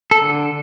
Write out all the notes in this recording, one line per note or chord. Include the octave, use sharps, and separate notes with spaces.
A4
D3